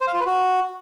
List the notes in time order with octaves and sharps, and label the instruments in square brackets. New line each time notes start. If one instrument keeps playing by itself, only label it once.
[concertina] C5
F5
F4
B4
F#4